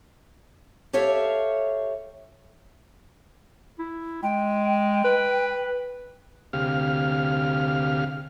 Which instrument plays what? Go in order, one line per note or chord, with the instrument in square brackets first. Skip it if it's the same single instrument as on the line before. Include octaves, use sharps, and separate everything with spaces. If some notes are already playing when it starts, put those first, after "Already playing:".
[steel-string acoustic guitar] G4 A4 C#5 E5 F5
[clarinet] E4
[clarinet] G#3 [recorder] G5
[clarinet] B4
[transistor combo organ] D2 C3 G4 F5 F6